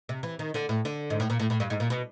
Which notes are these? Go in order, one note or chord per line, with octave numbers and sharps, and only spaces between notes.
C3
E3
D#3
D3
A2
D3
G#2
A2
A#2
A2
A2
G2
G#2
A#2
B2